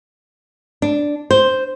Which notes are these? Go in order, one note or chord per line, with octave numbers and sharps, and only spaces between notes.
D4
C5